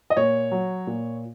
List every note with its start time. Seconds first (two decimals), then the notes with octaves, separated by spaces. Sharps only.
0.10 D#5
0.17 A#2 C#5
0.51 F#3
0.87 A#2